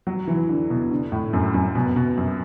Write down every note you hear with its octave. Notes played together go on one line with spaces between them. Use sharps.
F#3
E3
D3
B2
D3
A2
F#2
F#2
B2
B2
F#2